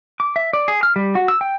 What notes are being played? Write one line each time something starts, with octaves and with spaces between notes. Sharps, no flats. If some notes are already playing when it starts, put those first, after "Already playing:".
D6
E5
D5
G#4
F6
G3
F#4
E6
G5